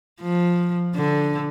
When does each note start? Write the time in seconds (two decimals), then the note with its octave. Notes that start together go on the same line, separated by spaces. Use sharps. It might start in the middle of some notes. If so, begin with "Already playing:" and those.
0.21 F3
0.95 D3